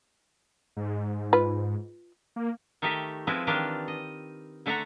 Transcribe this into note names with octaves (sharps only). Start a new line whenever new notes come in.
G#2
F4 B4
A#3
D#3 A3 D#4 G4 E5
F3 G#3 C4 E4 B4
D#3 E3 D4 F4 G4 D5
D#5
D3 A3 D5 E5 F#5 A#5